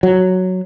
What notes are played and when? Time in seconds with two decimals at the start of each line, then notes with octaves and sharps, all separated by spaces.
0.03 F#3